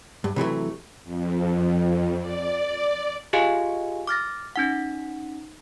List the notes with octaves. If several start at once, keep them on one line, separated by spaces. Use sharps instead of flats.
G2
C3 E3 F#3 A3
F2
D5
F4 G4 G#4 D#5 F5 G#5
D6 F6 A6 A#6
C#4 D#4 F#5